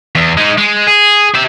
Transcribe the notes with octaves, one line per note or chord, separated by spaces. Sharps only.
E2
G#3 D#4
G#3
G#4
G4 E5